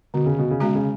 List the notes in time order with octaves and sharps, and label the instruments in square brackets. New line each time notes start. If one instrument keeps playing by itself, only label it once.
[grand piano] B2 [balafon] D3
[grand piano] C#3
B2
C#3
[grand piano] B2 [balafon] G#3 C#4 F#4
[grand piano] C#3